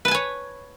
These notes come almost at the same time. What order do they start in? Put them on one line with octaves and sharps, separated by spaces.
B4 A5 G#5 C#5